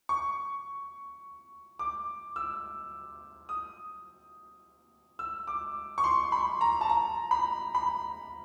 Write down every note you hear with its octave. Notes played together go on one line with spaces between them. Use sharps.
C#6
D6
E6
D#6
E6
D6
C#6
C6
B5
A#5
A5
A#5
B5
B5